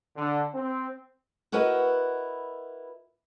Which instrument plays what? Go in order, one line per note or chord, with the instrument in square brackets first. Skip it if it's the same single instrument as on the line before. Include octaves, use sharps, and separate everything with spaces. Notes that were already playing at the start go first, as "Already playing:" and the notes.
[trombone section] D3
C4
[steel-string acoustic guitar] E4 F#4 A#4 B4 D#5